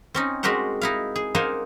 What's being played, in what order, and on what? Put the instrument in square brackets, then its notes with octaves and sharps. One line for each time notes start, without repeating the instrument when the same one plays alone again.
[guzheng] C4 C#4 D#4
G#3 F#4 G4 A#4 C5 F#5
D#4 E4 F5
G#4
A#3 D#4 C5 F5 F#5 G#5